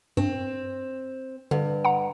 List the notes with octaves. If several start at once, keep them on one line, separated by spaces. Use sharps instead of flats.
G2 C4
G2 D3
F#5 A#5